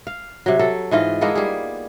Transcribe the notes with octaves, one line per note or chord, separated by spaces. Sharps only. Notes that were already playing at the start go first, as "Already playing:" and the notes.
F5
C3 F#3
F#3 A4
G#2 E3 F4 D#5
G#3 A#3 B3 A4
G3 G#4